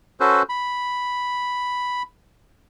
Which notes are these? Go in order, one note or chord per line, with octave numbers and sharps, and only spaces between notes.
C#4 F#4 A4 B4 C5
B5